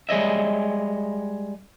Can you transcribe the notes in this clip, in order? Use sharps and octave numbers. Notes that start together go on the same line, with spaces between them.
G3 G#3 C#5 D#5 E5